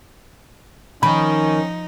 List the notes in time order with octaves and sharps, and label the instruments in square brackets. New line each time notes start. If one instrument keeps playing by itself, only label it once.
[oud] D#3 [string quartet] F3 D#4 [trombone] C#4 [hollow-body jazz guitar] B5